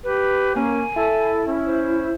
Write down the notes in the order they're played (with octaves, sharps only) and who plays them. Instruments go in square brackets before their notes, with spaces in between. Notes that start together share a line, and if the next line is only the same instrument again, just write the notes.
[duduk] G4 [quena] B4
[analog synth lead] A#3 [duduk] C#4 [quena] G#5
[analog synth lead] E4 [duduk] A4
[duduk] C#4
[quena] C5